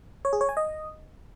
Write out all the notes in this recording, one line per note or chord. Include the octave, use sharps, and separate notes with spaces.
C#5
G#4
C#5
G#5
D#5